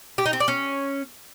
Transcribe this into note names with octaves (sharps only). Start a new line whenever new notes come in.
G4
D#4
C4
D5
C#4